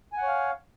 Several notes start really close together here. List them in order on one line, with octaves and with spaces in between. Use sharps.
G#5 F#5 C#5 F5